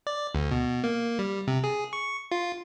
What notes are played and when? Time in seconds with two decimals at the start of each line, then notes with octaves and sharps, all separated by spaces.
0.07 D5
0.35 D2
0.51 B2
0.84 A#3
1.19 G3
1.48 C3
1.64 G#4
1.93 C#6
2.32 F4